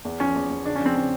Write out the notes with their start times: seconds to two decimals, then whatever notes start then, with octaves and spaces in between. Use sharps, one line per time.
0.05 E2
0.20 F3 C#4
0.35 E2
0.50 E2
0.65 C#3 D4
0.76 C#4
0.81 F3 C4
0.96 C#3 C4